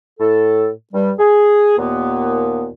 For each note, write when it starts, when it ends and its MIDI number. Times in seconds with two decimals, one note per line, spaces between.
0.20 0.70 45
0.20 0.70 69
0.93 1.11 43
0.93 1.11 55
1.19 1.77 68
1.78 2.68 39
1.78 2.68 46
1.78 2.68 58
1.78 2.68 59